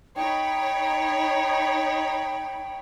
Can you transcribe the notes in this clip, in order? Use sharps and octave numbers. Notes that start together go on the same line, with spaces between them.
D#4 C#5 G5 B5